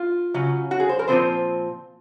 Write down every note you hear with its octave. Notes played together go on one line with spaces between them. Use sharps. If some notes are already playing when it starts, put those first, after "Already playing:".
Already playing: F4
C#3 F#3 C#4
F#4
G#4
C5
A#4
A#2 F3 C4 F4 C5